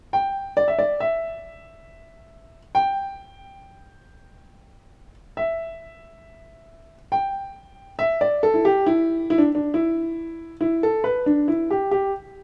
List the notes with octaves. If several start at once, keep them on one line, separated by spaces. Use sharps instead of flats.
G5
D5
E5
D5
E5
G5
E5
G5
E5
D5
A4
E4
G4
E4
E4
D4
D4
E4
E4
A4
B4
D4
E4
G4
G4